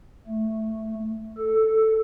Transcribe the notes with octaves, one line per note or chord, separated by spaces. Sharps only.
A3
A4